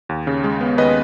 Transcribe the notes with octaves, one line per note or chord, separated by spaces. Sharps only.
D#2
C#3
G#3
B3
D#2 B4 D#5